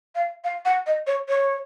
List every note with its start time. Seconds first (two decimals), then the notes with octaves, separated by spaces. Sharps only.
0.15 F5
0.44 F5
0.65 F#5
0.87 D#5
1.07 C#5
1.29 C#5